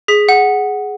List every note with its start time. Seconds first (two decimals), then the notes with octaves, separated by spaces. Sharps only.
0.08 G#4 B6
0.29 F#5